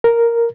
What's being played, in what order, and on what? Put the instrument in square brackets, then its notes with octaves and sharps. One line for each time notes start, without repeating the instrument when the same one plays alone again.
[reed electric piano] A#4